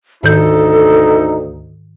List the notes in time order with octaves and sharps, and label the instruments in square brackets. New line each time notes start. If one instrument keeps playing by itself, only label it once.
[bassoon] D2 [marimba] G#2 D#3 G6 [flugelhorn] D#4 [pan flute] A4